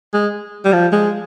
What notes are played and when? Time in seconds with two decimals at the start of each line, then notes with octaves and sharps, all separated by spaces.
0.13 G#3
0.65 G3
0.73 F3
0.92 G#3